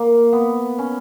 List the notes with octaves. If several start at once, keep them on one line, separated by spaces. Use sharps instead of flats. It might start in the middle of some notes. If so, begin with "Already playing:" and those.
Already playing: A#3
B3
C#4